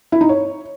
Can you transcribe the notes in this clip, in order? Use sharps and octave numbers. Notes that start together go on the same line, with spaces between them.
E4
D#4
C#5